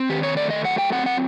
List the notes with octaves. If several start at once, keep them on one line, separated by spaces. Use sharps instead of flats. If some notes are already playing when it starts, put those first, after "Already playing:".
Already playing: C4
D#3 G4
C#5
A3 D5
D#5
F#3 F#5
G5
C4 F#5
F#5